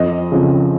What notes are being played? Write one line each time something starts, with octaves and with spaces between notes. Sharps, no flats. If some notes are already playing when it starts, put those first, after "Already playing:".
Already playing: F2 D#5
C#3 F3 C4